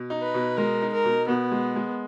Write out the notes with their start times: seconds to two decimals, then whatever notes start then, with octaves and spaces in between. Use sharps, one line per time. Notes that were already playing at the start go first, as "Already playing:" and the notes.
Already playing: B2
0.10 D#4
0.22 B4
0.34 B2
0.57 G#3 A#4
0.82 D#4
0.92 A#4
1.04 B2
1.28 B2 B3
1.51 G#3
1.76 G#3